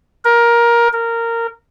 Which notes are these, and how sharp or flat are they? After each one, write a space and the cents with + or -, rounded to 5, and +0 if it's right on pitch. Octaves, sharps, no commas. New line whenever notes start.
A#4 +15
A#4 -15